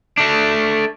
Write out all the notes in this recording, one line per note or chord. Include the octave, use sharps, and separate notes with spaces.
A3 D4